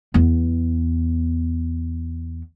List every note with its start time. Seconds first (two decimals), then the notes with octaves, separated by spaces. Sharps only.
0.14 E2 B3